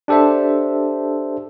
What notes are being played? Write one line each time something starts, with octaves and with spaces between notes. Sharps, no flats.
D4 G4 A4 C5 E5